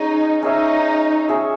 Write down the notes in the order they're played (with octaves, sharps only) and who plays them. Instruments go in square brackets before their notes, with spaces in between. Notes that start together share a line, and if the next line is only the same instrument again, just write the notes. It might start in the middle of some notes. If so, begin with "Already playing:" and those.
Already playing: [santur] C#4 G#4 C#5 [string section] D#4
[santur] C#4 G#4 C#5 E5 [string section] D#4
[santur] C#4 G#4 C#5 E5